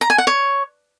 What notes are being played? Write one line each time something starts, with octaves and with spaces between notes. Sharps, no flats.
A#5
G#5
F#5
C#5